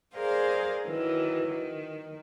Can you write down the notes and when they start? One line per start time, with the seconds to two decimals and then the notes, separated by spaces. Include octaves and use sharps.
0.15 G#4 A#4 C5 D5 F5
0.85 D#3 E3 F#3
1.45 D#3